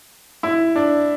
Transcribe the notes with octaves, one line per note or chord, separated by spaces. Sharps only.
E4
D4